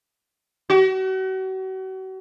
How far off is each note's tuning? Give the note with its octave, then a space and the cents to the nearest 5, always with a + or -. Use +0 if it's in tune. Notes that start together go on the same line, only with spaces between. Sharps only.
F#4 +40